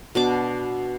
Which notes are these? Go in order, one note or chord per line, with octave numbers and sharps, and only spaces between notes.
B2 D4 D6